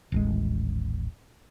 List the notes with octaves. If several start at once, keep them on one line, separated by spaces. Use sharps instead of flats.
D#1 A1 G#3